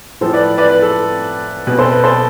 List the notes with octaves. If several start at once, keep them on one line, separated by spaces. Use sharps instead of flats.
A2 F3 A4 C5
B4 D5
B4 D5
B4
A4
B2 B4
A4 C5
B4
A4 C5